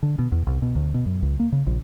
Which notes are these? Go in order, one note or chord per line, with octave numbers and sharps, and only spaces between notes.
D3
B2
E2
C2
B2
D2
B2
F#2
C#2
A#3
C#3
A#1